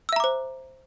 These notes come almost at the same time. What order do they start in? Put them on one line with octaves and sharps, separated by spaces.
E6 E5 A#5 D6 C5